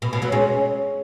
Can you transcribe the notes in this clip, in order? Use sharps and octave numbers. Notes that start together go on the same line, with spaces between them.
B2
B2
F#3 B3
G#3 C#4